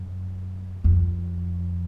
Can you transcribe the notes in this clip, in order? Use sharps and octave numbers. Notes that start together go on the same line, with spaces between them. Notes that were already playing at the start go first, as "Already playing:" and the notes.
Already playing: F#2
F2